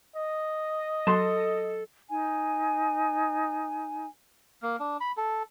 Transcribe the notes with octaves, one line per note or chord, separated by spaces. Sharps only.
D#5
F#3 A4 A5 C6
D#4 G#5
A#3
D4
B5
A4